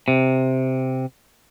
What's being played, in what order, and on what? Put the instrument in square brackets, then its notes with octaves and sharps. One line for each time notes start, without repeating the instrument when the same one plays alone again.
[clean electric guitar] C3